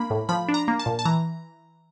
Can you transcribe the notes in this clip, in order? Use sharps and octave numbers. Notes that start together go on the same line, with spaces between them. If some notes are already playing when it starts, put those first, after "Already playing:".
Already playing: A#3 D4 B5
A2
F3 B5
D4
A#5
A#3
A5
A#2
A5
E3 A#5